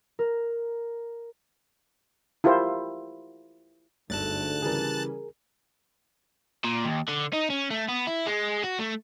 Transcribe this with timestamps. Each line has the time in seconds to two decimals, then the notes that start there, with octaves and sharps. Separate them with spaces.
0.19 A#4
2.44 E4 F4 G4 A#4 C5
4.10 G1 D2 G#2 D3 A5 F#6 A6
4.62 C#3 E3 G3 G#4 A#4
6.64 A#2
6.85 D#2
7.09 D3
7.33 D#4
7.50 C#4
7.70 A3
7.88 B3
8.07 E4
8.26 G#3
8.63 F#4
8.79 A3